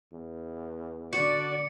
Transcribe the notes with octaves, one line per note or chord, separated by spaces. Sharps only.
E2
D3 F#4 D5 C#7